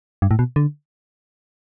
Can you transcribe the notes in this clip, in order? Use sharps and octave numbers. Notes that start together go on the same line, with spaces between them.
G2
A2
B2
D3